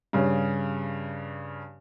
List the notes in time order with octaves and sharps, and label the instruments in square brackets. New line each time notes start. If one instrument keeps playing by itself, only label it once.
[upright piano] G2 C#3